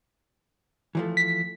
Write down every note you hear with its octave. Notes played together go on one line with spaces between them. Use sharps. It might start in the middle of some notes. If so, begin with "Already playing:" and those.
E3 F3 A3
B6